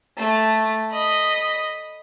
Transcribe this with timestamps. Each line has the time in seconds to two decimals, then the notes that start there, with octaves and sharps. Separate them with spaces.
0.17 A3
0.91 D#5 B5